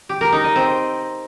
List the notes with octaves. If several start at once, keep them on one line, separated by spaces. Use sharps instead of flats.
G4
A#4
D#4
D#5
C4